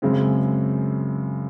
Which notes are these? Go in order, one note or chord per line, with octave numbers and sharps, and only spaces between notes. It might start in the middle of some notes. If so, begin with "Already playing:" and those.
F#2 C#3 G#3 C4